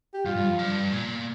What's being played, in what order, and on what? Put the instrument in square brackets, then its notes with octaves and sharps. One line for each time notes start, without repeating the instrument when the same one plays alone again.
[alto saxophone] G4
[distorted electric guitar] G2 [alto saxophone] F4
[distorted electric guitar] G2
F2
G2
A#2